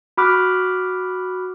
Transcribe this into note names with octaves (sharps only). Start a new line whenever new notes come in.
F#4 B5 D6 F6 F#6